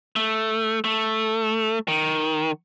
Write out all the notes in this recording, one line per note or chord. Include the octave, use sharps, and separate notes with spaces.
A3
A3
D#3